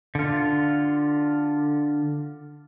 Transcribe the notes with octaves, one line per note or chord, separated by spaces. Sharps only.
D3 F4